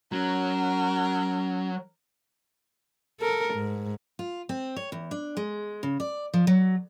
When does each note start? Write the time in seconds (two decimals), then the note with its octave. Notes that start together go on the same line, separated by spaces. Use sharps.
0.12 F#3 C#4 A#4
3.20 A4 A#4
3.54 G#2
4.19 F4
4.49 C4
4.76 C#5
4.92 E2
5.11 D4
5.37 G#3
5.83 C#3
6.00 D5
6.34 F3
6.47 F#3